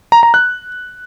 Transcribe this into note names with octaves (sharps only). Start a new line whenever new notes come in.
A#5
A#5
F#6